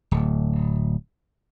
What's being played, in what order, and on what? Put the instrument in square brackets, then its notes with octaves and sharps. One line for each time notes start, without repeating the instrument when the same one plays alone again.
[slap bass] D1